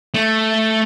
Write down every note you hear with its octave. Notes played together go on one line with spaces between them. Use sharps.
A3